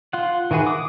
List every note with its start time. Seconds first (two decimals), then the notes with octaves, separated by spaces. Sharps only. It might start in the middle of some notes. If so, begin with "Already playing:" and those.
0.13 F4 F#5
0.51 D#3 E3 F#4 G#4 B4
0.66 D6 D#6